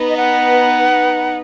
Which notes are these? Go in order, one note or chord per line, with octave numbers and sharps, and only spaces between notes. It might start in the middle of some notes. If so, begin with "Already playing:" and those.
Already playing: B3 D#4 B4
D#5
F#5